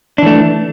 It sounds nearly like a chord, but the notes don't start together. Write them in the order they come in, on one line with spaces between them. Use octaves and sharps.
D4 E3 A3